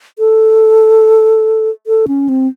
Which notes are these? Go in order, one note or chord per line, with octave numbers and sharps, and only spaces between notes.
A4
A4
C#4
C4